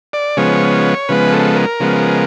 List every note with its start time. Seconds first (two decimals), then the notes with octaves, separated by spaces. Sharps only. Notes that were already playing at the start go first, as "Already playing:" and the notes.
0.13 D5
0.37 C#3 F3 G#3 B3 C#5
1.09 C#3 F3 G#3 B3 B4
1.32 A4
1.56 A#4
1.80 C#3 F3 G#3 B3